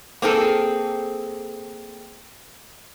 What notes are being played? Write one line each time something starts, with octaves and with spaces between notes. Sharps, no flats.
A#3 C4 G#4 A4